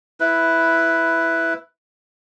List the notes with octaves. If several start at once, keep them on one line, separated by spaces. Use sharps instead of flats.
E4 B4